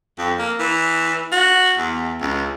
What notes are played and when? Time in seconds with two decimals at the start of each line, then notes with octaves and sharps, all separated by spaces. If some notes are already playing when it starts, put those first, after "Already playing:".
0.18 F2
0.39 A#3
0.60 E3
1.32 F#4
1.78 E2
2.20 C#2